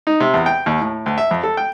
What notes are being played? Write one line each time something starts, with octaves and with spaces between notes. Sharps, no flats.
D#4
C3
E2
G5
D#2
A2
D2
E5
F2
A4
G5